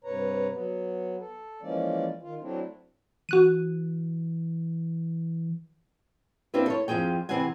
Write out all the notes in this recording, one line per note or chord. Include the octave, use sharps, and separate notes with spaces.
G2 C3 B4 C#5 A#5
F#3 B3
A4
E3 F3 G#3 A#3 C#4 D5
D#3 F4
F#3 A3 C4 D4 E4
E3 F#4 F#6 D#7
A#3 C4 D4 E4 G4 B4
A4 C#5
F2 C#3 F3 G#4 G5
C3 E3 C4 G#4 F#5 G#5